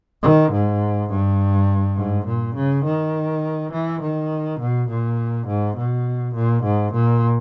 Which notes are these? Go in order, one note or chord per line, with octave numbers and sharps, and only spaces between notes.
D#3
G#2
G2
G#2
A#2
C#3
D#3
E3
D#3
B2
A#2
G#2
B2
A#2
G#2
A#2